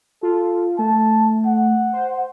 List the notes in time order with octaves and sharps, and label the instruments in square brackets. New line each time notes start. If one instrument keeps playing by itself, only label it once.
[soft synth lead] F4 [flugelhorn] A4
[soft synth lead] A3 [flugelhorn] A5
[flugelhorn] F#5
[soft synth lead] C5